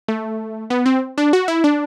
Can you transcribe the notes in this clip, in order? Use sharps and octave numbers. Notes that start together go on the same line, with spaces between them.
A3
B3
C4
D4
F#4
E4
D4